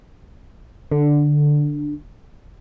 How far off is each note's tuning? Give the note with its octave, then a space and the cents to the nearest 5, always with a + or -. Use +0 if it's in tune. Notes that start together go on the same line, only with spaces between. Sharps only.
D3 +5